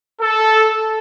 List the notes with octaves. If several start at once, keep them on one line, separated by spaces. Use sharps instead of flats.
A4